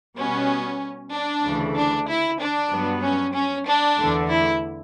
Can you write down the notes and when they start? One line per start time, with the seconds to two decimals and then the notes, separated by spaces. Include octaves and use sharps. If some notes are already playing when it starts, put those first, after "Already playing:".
0.18 B2 G3 B3 C#4
1.13 D4
1.45 D2 C#3 E3 A3
1.75 D4
2.08 E4
2.40 D4
2.71 G2 F#3 B3
3.02 C#4
3.34 C#4
3.66 D4
3.97 E2 D3 A3
4.29 E4